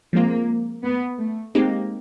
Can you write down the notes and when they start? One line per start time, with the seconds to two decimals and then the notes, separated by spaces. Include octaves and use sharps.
0.13 F3 G#3 A#3 C4 F4
0.84 B3
1.19 A3
1.55 G#3 A#3 C4 D#4 G4